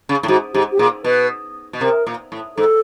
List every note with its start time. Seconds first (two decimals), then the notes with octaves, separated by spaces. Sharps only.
0.09 C#3
0.23 A2
0.28 G#2 F#4
0.54 G#2 G4
0.72 G4
0.79 A#2 G#4
1.04 B2 B4
1.73 B2
1.81 C3 A#4
2.07 A#2
2.32 A2
2.57 G#2 A4